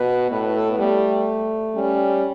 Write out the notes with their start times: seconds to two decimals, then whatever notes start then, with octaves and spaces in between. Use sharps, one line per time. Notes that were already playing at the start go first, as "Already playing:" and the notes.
Already playing: B2 B4
0.30 A2 B4
0.43 B4
0.55 A4
0.68 B3
0.79 G3 A3
1.75 G3 C#4